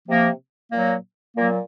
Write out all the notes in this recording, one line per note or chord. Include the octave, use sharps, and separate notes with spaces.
C3 F3 A#3
A#2 F#3 A#3
A#2 F#3 A#3